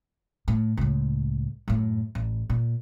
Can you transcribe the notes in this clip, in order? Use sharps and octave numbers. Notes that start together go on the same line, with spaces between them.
A2
C#2 A2
F#2 A2
A1
A#2